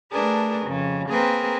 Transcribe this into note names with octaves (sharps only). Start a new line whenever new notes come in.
A3 D4 G#4 A#4 B4
F2 C#3
A#3 C4 G#4 A#4 B4